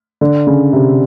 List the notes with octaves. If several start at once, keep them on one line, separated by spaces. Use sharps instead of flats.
D3
C#3
C3